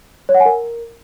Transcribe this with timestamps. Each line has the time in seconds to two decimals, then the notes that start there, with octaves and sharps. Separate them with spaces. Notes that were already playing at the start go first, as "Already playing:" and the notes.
0.29 C#5
0.34 F#5
0.40 G#5
0.46 A#4